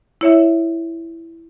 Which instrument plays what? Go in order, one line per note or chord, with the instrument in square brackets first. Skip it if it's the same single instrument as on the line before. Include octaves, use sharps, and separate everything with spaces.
[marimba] E4 C#5 E5